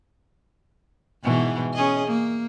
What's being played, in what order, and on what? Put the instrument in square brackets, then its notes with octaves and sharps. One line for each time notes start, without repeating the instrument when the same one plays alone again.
[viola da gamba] G#2 B2 E3
C#4 G#4 D#5
A#3